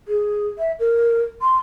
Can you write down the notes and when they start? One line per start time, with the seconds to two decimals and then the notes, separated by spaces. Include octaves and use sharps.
0.08 G#4
0.58 E5
0.80 A#4
1.42 C6